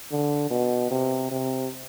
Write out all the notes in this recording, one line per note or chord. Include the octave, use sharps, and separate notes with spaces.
D3
B2
C3
C3